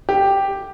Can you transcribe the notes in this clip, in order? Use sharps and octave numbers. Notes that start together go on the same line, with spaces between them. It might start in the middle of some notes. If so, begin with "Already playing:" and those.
G4